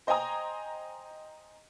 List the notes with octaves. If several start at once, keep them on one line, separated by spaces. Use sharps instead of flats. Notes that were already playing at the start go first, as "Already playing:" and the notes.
C5 D#5 G5 G#5 A#5 D#6